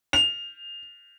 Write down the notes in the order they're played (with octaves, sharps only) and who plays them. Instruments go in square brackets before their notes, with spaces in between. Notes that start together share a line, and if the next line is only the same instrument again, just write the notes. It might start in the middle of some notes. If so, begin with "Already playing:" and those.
[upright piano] F7